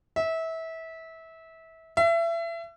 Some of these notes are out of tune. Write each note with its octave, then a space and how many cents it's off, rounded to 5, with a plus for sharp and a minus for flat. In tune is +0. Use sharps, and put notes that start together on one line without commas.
E5 -25
E5 +30